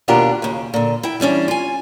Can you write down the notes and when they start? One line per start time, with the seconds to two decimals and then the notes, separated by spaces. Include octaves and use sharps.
0.08 D#2 B2 D4 F4 G4 A#4
0.42 D#2 C#3
0.74 A#2 D3
1.03 E4 G5
1.20 E3 G3 C#4 D4
1.48 F4 G#5